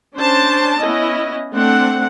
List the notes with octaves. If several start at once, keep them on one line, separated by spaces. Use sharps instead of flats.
C#4 D4 C5 A5
B3 C#4 E4 D#5
A3 C4 D4 F#5